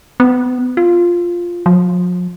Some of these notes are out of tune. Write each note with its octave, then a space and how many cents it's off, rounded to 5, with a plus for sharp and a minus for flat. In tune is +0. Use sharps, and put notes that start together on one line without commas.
B3 +30
F4 +0
F3 +45